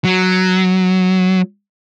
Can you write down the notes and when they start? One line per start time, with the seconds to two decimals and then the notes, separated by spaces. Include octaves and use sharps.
0.04 F#3